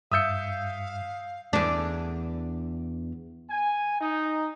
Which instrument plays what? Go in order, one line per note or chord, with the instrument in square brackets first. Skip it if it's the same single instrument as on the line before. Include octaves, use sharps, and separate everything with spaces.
[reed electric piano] G2 [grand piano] E5 G6 [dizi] F5 [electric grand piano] D#6 E6 C#7
[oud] E2 D4
[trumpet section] G#5
D#4